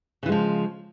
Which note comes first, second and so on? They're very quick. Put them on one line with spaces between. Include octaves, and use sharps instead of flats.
C#3 E3 G#3 F3